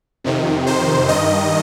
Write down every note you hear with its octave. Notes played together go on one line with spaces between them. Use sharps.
F2 C3 D#3
C5
G2 D#3 D#5